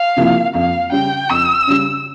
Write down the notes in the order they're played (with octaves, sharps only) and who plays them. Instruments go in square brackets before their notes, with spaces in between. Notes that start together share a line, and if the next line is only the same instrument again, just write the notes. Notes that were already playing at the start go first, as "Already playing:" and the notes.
Already playing: [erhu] F5
[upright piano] C3 F3 A#3 E4
[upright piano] F2 [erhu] F5
[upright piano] C#3 G3 [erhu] G5
[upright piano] F2 [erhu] E6
[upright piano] C#3 G3